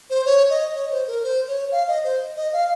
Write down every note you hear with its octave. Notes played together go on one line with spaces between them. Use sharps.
C5
C#5
D#5
C#5
C5
A#4
C5
C#5
F5
D#5
C5
D#5
F5